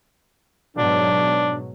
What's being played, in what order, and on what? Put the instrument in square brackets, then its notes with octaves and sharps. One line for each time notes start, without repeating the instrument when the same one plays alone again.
[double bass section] G#2 B2 F#3 [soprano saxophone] D4